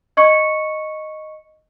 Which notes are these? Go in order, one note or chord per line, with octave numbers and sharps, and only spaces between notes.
D#5 C#6 C#7